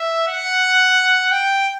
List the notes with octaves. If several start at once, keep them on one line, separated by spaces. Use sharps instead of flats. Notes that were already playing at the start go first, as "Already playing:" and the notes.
Already playing: E5
F#5
G5